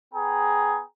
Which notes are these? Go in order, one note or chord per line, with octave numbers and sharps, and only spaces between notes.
B3 G#4 G5 A#5